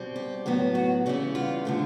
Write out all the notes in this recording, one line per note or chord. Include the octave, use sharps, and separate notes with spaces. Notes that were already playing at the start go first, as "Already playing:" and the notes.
Already playing: B2 G3 C4
G4
A2 F#3 B3
F#4
C#3 E3 G3 B3
F4
D3 F3 A3